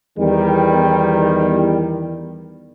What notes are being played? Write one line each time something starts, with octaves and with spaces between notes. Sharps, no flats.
E2 D#3 G3